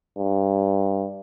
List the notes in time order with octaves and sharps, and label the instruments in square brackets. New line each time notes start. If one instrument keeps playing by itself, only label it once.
[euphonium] G2